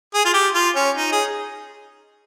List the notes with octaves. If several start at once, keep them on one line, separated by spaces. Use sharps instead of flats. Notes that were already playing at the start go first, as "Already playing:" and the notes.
G#4
F4
G4
F4
C#4
D#4
G#4